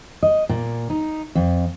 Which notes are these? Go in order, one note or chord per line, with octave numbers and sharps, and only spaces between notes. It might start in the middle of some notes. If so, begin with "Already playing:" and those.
D#5
A#2
D#4
F2